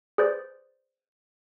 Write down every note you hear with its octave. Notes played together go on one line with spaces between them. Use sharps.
G#4 B4 C5 D5